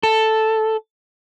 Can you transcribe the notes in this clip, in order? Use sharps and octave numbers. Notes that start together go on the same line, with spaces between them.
A4